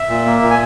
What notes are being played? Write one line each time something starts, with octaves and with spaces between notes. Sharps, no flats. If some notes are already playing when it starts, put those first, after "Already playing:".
Already playing: E5
A#2
A#3
A#2
G#5